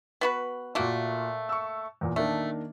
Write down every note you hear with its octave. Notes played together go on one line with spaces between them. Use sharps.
B3 F#4 B4
A#2 A3 A#3 F#4
C#6 E6
E2 A#2
D#3 A3 A#3 D4